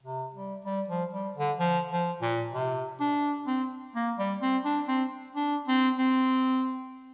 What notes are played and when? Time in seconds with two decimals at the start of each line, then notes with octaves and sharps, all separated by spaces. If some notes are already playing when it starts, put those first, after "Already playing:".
0.03 C3
0.34 G3
0.65 G3
0.88 F3
1.12 G3
1.36 D3
1.59 F3
1.91 F3
2.22 A#2
2.53 C3
3.00 D4
3.47 C4
3.95 A#3
4.19 G3
4.41 C4
4.64 D4
4.88 C4
5.35 D4
5.67 C4
5.98 C4